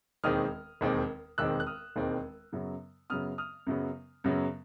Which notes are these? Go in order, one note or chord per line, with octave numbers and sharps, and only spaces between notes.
E1 D#2 D#3 G#3 C4 D#6 F6
E1 D#2 D#3 G#3 C4
E1 D#2 D#3 G#3 C4 E6 F#6
F#6
D#6 F6
E1 D#2 D#3 G#3 C4
F#2 C#3 F#3 B3
F#2 C#3 F#3 B3 D#6 F6
D#6 F6
F#2 C#3 F#3 B3
F#2 C#3 F#3 B3